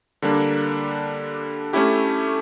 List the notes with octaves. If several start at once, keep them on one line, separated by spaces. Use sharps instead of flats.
D3 G3 A#3 D4
A3 C#4 E4 G4